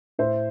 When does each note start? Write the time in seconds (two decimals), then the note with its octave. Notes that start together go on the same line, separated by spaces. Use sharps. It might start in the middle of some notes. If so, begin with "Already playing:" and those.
0.18 A2 C5 E5